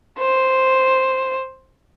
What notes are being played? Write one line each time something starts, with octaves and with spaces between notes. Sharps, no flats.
C5